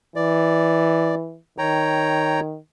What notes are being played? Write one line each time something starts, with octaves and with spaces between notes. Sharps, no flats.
E3 D5
D#3 C#5 G5 A#5